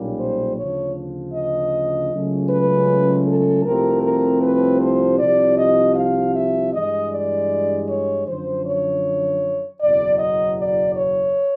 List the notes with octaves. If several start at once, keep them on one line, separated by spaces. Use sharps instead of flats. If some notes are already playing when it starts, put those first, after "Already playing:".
Already playing: B1 A#2 G3 A#3 C#4
C5
D2 C#3 F3 C#5
D#5
C#2 C#3 F#3 A3 C#4
B4
A4
C2 C3 F3 A3 C4 A#4
A#4
B4
C5
C2 C3 F3 D5
D#5
F5
E5
G2 E3 G#3 D#5
D5
C#5
F#2 D3 F3 C5
C#5
F#1 E2 B2 F#3 D5
D#5
D5
C#5